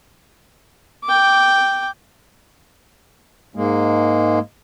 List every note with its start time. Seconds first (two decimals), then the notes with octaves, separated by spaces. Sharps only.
1.04 G5 D6
3.55 G#2 G#3 A#3